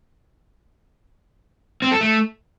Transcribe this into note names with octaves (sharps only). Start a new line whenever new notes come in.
C4
A4
A3